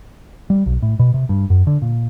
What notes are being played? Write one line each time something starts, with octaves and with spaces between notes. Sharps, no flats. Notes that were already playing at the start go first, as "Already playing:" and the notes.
G3
B1
A2
B2
C3
G2
F#2
D3
A#2